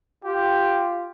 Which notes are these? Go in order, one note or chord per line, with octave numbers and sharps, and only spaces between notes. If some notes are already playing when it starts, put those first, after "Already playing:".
F4 G4